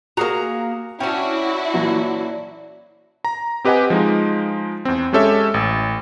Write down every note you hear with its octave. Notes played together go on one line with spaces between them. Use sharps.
A#3 F#4 G#4 A#4 A#5
C#4 D4 E4 F#4 G5
A#2 E3 F#3
A#5
C4 G4 B4 D#5 F#5 G#5
F3 G#3 D#4
E2 C4
G#3 C#4 G4 A4 C#5 E5
A1